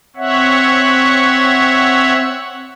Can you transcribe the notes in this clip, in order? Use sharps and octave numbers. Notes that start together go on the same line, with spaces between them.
C4 C#5 E5 F#5